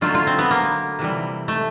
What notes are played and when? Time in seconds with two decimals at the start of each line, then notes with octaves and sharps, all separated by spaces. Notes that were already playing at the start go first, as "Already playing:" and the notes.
0.01 D3 F#3 A3 F4
0.14 F4
0.27 C4
0.39 B3
0.51 A#3
0.99 C3 E3 G3
1.48 A3